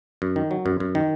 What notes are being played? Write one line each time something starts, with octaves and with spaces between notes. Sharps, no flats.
F#2
D#3
F#3
F#2
F#2
D#3